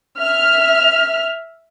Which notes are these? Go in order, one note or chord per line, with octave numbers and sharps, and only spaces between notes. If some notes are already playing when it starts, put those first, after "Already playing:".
E5 F6